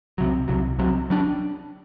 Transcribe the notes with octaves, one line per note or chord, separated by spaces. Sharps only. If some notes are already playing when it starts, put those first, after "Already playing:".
C2 C3 F#3
C2 C3 F#3
C2 C3 F#3
F#3 A#3 D4